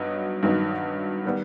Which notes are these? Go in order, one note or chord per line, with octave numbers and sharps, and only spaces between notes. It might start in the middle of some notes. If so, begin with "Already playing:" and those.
Already playing: G2 F#3 B3 D#4
G2 D#3 F#3 B3 D#4
D#3 G3 B3